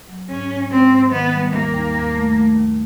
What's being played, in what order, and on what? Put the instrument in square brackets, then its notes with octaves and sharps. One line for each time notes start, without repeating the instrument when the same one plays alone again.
[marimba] F#3
[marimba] G#2 [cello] C#4
[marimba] G#2
[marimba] G#3 [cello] C4
[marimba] G#2
[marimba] D#3 [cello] B3
[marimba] G3
[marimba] D#2 [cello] A#3
[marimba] D#2
D#2
A3
A3
D#2